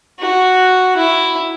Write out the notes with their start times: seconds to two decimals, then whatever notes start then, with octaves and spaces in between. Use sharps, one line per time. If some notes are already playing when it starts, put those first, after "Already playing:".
0.20 F#4
0.97 E4